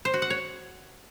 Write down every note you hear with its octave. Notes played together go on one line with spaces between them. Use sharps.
C5
F#4
F#5
C#5